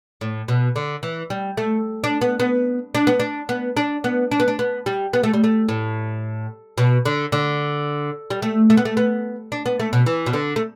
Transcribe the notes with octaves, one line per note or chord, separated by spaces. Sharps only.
A2
B2
D3
E3
G3
A3
D4
B3
B3
D4
B3
D4
B3
D4
B3
D4
B3
D4
B3
G3
B3
A3
G3
A3
A2
B2
D3
D3
G3
A3
A3
B3
A3
B3
D4
B3
A3
B2
E3
B2
D3
A3